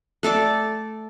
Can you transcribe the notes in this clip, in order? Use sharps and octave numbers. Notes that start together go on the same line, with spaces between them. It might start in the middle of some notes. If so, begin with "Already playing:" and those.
A3 A4 D5 D6